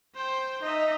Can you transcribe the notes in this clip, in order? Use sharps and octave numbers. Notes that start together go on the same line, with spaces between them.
C5 G5
D#4 D#5 E5